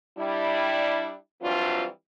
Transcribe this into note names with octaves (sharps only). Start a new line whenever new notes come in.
G3 D4 E4
E3 F#3 G3 C4 D4 F4